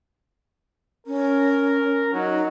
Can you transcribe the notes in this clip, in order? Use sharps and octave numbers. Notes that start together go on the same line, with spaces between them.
C#4 A#4
F#3 D#4